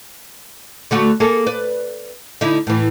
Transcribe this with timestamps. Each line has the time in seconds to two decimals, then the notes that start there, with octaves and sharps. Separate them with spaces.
0.91 D3 A3 F#4
1.20 A#3 G#4 A4
1.47 B4 D5
2.41 D3 D#4 E4
2.67 A2 E3